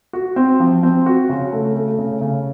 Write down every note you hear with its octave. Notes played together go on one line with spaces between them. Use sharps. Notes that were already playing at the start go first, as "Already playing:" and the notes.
F#4
C4
F3
C4
F#4
C#3
A3
A3
C#3
C#3